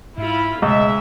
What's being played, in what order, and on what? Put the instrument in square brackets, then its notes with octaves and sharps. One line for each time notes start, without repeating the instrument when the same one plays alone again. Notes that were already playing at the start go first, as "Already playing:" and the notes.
[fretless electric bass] G#2 [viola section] E4 F4 B5
[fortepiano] C#2 [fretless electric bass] B2 A3 [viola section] G#3 E5 [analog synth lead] D#5